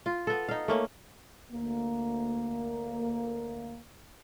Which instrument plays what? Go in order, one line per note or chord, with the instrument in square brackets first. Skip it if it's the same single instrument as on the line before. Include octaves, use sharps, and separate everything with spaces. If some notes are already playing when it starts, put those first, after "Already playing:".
[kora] F4
B3 A4
D#4 F5
A3 A#3 C#4
[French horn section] D2 A#3